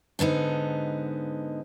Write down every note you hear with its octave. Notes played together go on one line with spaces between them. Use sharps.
G#2 D3 B3 D#4